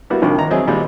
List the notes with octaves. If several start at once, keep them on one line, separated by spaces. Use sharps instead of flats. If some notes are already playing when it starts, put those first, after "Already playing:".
G3 A#3 B3 E4 F#4
C2 G2 D#3 F3
D#2 A#5
F#3 C4 G#4 D#5 E5
D#2 A#2 G3 G#3 A#3